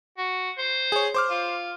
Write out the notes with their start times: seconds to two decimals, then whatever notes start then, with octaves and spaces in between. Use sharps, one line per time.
0.18 F#4
0.58 C5
0.92 G#4 C#5
1.14 C5 D6 F6
1.30 F4